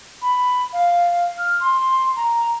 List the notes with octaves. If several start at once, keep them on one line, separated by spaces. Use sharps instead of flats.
B5
F5
F6
C6
A#5